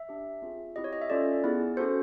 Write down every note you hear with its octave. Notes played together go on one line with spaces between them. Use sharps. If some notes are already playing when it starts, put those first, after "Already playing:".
Already playing: E5
D4 G4
C4 F4 G#4
C4 E4 G4 D#5
C#5
D#5
E5
C#4 F4 A4 D5
B3 E4 G#4
C#4 F#4 A4 C5